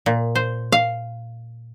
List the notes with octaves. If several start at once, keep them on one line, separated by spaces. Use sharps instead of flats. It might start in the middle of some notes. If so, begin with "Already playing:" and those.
A#2
C5
F5